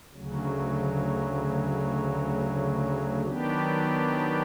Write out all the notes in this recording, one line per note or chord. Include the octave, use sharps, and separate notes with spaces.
D2 C#3 F#3
D#3 F#3 B3 D4 G4